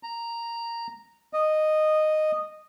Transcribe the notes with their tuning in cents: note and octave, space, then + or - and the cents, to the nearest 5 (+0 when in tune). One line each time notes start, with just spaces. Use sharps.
A#5 -5
D#5 -10